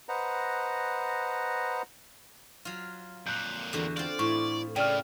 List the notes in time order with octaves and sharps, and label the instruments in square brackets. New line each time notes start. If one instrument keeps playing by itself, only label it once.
[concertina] B4 C5 D#5 F#5 A#5
[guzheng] F#3 F4
[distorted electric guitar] F2 A#2 [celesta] F#6 G6
[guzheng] E2 D3 F#4
[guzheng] C4 F4 [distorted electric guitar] D5
[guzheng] A2 [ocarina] E4 [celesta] C#6
[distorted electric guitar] A2 [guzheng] C#3 [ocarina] D5 [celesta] G5 F6